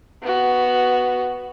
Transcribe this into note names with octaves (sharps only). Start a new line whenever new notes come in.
B3 F#4